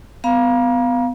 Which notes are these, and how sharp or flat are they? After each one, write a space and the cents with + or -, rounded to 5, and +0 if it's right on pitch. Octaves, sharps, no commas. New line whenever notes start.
B3 +25 F5 +0 A#5 +35